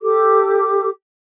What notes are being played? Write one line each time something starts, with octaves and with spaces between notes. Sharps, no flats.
G4 A4 D6